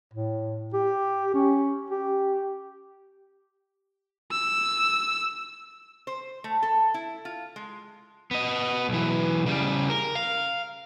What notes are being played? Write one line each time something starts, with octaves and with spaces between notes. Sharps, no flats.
A2
G4
C#4
G4
E6
C5
A3
A4
E4
F4
G#3
B3 D#5
B1 E3
C#3 G3
A#4
F5